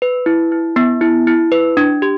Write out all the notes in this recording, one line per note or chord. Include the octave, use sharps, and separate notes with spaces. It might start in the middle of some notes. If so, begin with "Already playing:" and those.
B4
E4
E4
B3
E4
E4
B4
D4
G4